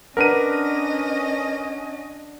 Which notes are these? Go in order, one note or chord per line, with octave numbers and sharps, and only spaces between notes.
C#4 D4 A#4 B4 D#5 F#5 D#7